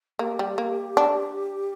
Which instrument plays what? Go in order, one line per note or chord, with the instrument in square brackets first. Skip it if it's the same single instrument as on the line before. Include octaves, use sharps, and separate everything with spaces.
[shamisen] A#3 [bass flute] G4
[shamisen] G3
A#3
D4